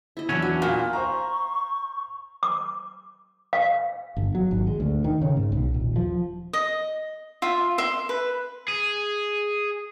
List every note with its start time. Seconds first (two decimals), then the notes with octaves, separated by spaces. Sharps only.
0.17 E4 D#5
0.29 E2 F#3 C#4 D4 E5
0.42 F#4
0.62 A#2
0.93 C5 F5 A#5 C#6
2.43 D6
3.53 F5
4.16 G1
4.35 F#3
4.51 G#1
4.67 G#3
4.80 D2
5.04 D#3
5.21 C#3
5.37 G#2
5.52 B1
5.74 D#1
5.96 F3
6.53 D#5
7.42 F4 E5
7.78 E5 C6
8.09 B4
8.68 G#4